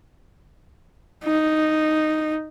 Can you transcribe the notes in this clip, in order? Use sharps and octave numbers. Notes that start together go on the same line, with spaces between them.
D#4